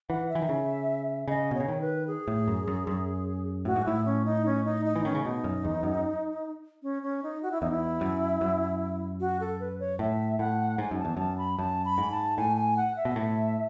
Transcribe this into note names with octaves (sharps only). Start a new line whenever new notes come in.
E3 F#5
E5
E3
D#3
C#3
C#3 D#5
B2
C#5
C#3
D#3
B4
G#4
A2
F#2
F#2
F#2
A2 F#4
G#2
A2 E4
C#4
D#4
C#4
D#4
D#4
E3
D#3 C#4
C#3
B2 D#4
F#2
E2
F#2
C#4
C#4
D#4
F#4
E4
E2 D#4
E4
F#2
F#2
F#4
A4
B4
C#5
A2 E5
A2 F#5
G#2 G#5
F#2
A5
E2
F#2 A5
B5
F#2 A5
B5
G#2
A5
A2 G#5
G#5
F#5
E5
B2
A2